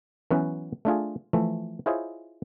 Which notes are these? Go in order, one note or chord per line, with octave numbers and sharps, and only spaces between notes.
E3 F#3 B3 C#4 B4
A3 D4 F4 G#4
E3 F3 A3
E4 F4 G#4 C5 C#5 D#5